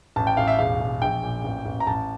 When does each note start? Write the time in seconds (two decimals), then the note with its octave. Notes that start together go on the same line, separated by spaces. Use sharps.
0.16 A1 A5
0.27 G5
0.37 A1 F5
0.48 E5
0.59 E1 F5
0.80 E1
1.02 A#1 G5
1.23 A#2
1.44 A1
1.66 A1
1.80 A#5
1.87 A1 A5